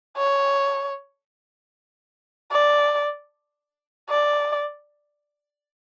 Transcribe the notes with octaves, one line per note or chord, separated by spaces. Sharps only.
C#5
D5
D5